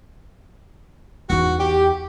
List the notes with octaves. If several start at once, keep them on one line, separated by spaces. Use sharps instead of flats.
E2 D#4 F#4
G4